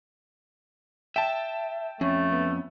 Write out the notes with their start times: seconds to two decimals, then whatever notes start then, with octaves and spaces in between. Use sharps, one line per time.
1.16 E5 G5 A5
2.01 F2 A3 C#4
2.32 B3